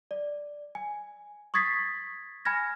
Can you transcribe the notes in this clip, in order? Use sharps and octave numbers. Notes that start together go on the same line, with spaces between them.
D5
G#5
C#6 D#6 G#6 A6 B6 C7
G#5 B5 F6 G#6 A#6